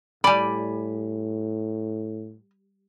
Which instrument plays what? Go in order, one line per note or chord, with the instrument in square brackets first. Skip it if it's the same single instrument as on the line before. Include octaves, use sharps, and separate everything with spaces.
[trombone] A2 [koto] G3 D5 [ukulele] G#5 B5